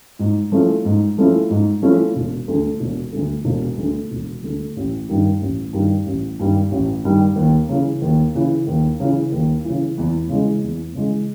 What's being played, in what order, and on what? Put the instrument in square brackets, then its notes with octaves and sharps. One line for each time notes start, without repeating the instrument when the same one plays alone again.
[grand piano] G#2
F3 A3 C#4 E4
G#2
F3 A3 C#4 E4
G#2
F3 A3 C#4 E4
E1
D2 D3
E1
D2 D3
E1
D2 D3
E1
D2 D3
A1
G2 D#3 G3
A1
G2 D#3 G3
A1
G2 D#3 G3
A1
G2 D#3 G3
D#2
C#3 E3
D#2
C#3 E3
D#2
C#3 E3
D#2
C#3 E3
E2
C#3 E3 G#3
E2
C#3 E3 G#3